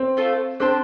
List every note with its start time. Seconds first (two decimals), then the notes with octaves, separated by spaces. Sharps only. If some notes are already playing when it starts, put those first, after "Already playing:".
Already playing: C4
0.17 A3 F4 A4
0.60 C4 D4 G4 C5 A5